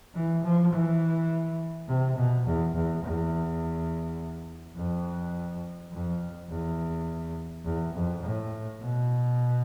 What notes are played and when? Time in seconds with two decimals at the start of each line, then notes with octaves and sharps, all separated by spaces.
0.15 E3
0.44 F3
0.73 E3
1.88 C3
2.16 B2
2.46 E2
2.74 E2
3.03 E2
4.76 F2
5.91 F2
6.50 E2
7.65 E2
7.93 F2
8.23 A2
8.80 B2